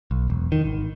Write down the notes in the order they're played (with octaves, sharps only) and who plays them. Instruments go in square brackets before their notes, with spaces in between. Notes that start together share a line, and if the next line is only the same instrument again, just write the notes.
[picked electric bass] B1
E1
D#3
G#1